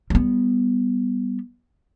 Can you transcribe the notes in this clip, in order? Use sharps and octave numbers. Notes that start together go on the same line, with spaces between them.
G3 B3